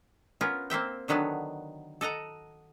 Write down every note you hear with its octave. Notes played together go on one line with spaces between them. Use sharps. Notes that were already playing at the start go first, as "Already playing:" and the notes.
B3 C#4 F4 A#4
A#3 C4 E5 G5
D3 D#3 F#3 B3 D4
A4 D#5 F#5 A#5